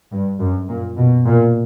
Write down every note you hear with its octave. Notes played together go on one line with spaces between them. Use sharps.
G2
F#2
A#2
B2
A#2